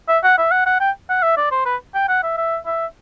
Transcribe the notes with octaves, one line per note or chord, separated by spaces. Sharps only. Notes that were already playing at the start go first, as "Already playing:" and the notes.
E5
F#5
E5
F#5
F#5
G5
F#5
E5
D5
C5
B4
G5
F#5
E5
E5
E5